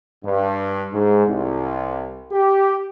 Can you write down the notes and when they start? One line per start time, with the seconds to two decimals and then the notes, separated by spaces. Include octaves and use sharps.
0.24 G2
0.94 G#2
1.27 C2
2.32 G4